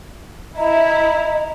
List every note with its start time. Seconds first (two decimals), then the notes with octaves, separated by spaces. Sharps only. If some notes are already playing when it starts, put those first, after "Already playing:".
0.57 E4 D#5 A#5